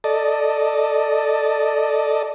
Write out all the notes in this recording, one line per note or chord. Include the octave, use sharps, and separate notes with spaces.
A4 D5 D#5